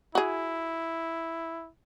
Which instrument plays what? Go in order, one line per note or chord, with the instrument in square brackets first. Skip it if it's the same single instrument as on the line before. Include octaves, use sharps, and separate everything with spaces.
[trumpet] E4 [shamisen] F#4 G#4